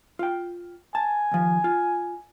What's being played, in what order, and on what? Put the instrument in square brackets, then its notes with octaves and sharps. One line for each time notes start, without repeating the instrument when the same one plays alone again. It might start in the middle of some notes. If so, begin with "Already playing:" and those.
[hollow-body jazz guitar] F4 G5
[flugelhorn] G#5 [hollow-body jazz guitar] A5
[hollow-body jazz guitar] D#2 F3
F4